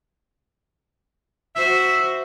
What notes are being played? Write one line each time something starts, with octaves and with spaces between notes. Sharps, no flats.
F#4 C5 E5